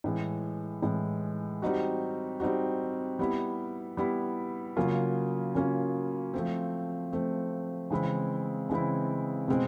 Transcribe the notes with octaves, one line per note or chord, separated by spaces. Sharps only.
A2 E3 G#3
A2 E3 G#3
G3 C4 D#4 F#4
G3 C4 D#4 F#4
G3 B3 E4
G3 B3 E4
C#3 F#3 A#3 C#4 F4
C#3 F#3 A#3 C#4 F4
F3 A3 C4
F3 A3 C4
C#3 E3 G#3 C4 E4
C#3 E3 G#3 C4 E4
B2 G#3 C4